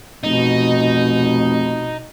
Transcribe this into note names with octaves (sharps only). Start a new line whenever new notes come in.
F1 B2 D#4